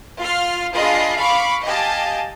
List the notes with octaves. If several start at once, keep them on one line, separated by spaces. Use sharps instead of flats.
F4 C6 F6
D4 F4 G#4 D#5 B5 C6
F5 B5 C#6 D6
G4 D#5 F5 G#5 A5